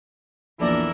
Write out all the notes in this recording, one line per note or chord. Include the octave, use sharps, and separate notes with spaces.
A#1 E2 E4 A4 A#4 D5